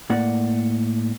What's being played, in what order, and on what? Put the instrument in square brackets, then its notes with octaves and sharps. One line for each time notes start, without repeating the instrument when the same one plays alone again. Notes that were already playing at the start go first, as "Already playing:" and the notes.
[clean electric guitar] A2 A#3 D5 F#5